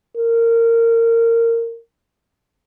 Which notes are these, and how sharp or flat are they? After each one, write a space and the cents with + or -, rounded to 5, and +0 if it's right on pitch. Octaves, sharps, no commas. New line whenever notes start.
A#4 -20